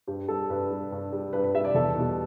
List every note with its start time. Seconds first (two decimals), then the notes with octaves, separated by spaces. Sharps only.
0.07 G2 G4
0.28 G3 A4
0.50 G2 B4
0.71 G3
0.92 G2
1.13 G3
1.33 G2 B4
1.44 B4
1.55 G3 E5
1.65 D5
1.74 E2 A4
1.95 B2 G3